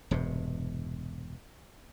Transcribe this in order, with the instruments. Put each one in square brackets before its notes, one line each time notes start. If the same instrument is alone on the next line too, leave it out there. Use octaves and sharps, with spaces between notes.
[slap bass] E1 G2 C3